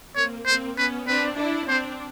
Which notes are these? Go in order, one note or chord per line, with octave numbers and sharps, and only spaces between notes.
A#3 C4 C#5
A#3 C4 C5
B3 C#4 B4
C4 D4 B4
D4 E4
C4 D4 C5